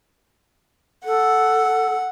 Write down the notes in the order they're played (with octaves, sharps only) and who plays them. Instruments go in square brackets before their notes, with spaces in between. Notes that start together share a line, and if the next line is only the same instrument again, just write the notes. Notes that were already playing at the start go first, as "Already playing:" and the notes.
[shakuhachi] A4 [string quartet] F#5